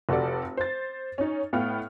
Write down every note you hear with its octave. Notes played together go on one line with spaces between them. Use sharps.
F1 F#4 G4 A4 D5
C5 A6
C#4 D#4
A2 B3 F5 G5 F6